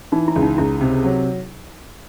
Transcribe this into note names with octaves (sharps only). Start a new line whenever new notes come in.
E3 D#4
E4
C#2
D#4
C#2 E4
C3
F#3